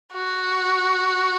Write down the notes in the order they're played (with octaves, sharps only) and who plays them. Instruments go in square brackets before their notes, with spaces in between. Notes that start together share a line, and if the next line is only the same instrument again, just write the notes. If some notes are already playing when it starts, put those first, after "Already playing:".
[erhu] F#4